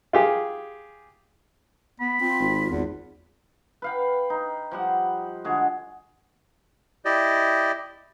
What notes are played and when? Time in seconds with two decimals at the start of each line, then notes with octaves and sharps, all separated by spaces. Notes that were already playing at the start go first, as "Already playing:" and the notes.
0.13 F4 G4 G#4
2.00 B3 B5
2.21 C4 F4
2.40 G#1
2.70 G#1 E2
3.82 B4 F5 G5
4.30 D#4
4.71 F3 G3 F#5
5.44 D3 G#3 F#4 G#4
7.05 E4 G4 D5 D#5